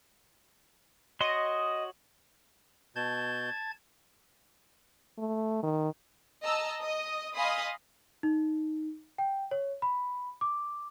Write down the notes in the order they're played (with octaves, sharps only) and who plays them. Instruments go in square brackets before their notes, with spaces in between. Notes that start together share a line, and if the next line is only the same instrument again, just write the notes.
[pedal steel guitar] F#4 C#5 C6 [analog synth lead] D#5
[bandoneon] B2 G6 [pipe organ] A5 G#6
[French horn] A3
D#3
[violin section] D#5 A5 A#5 E6
D#5 D#6
D#5 F5 G#5 B5 C6 D#6
[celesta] D#4
G5
C#5
B5
D6